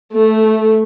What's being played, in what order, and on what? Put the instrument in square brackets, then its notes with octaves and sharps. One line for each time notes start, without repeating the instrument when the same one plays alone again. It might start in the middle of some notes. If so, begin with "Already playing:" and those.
[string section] A3